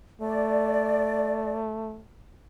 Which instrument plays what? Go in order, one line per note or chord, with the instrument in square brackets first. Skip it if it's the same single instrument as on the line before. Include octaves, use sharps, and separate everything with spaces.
[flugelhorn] A3 [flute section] D5